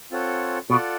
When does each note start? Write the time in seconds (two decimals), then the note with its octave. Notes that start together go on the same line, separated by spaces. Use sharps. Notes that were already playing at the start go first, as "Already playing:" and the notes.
0.11 C4 F4 A4 C#5 F#5
0.70 B2 F4 A4 D5 F#5